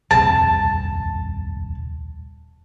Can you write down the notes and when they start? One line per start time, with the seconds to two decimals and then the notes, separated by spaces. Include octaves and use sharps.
0.11 D#1 C2 F2 A5